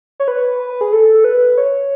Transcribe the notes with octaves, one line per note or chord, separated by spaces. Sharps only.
C#5
B4
B4
B4
G#4
A4
B4
C#5